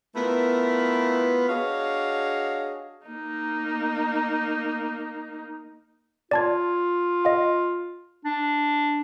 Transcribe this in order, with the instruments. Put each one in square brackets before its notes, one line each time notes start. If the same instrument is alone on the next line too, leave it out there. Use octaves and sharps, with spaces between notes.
[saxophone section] A3 B3 E4 F4 A#4 B4
D4 F#4 G#4 C#5 D#5 F5
[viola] A#3 D#4
[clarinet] F4 [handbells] D5 A5 G#6
[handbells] D#5 F5
[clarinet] D4